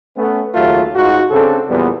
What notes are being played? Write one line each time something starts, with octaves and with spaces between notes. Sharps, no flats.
A3 B3 C#4
D#2 C#3 F#3 A3 A#3 F4
G#2 D#4 F4 F#4
C#3 C4 D4 A4
E2 A#2 F3 G3 B3